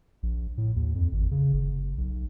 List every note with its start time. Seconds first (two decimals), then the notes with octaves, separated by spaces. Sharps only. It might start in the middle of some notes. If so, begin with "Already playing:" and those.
0.23 A#1
0.58 A2
0.76 D#2
0.95 F2
1.13 G#1
1.31 C#3
1.54 F#1
1.98 B1